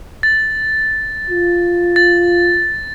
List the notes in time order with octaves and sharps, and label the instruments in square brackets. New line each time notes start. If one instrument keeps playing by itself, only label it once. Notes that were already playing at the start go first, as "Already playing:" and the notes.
[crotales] A6
[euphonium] F4
[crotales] A6